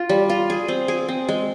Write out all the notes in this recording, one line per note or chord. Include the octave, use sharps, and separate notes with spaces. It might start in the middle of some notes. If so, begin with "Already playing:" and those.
Already playing: F4
G3
F4
G#4
C4
G#4
C4
G#3